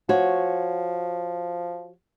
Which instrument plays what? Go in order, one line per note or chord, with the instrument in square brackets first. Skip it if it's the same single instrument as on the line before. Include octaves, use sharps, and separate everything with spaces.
[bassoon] F3 [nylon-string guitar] F#4 C#5